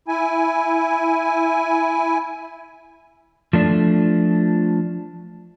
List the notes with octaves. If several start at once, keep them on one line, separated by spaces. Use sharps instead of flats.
E4 G#5
F3 A3 D4